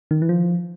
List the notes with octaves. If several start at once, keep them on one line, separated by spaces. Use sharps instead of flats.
D#3
E3
F3